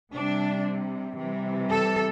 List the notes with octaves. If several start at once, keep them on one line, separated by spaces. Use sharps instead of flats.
C3 G3 D4
C3 E3 G3
A4